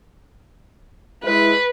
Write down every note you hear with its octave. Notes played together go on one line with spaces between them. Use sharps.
G#3 E4 B4